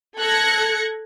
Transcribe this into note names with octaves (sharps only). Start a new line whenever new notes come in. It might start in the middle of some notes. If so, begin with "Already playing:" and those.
A4 F#6 G#6 A#6 C#7